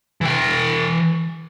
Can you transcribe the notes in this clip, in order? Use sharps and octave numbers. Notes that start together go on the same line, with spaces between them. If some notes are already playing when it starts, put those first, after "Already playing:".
E3 G5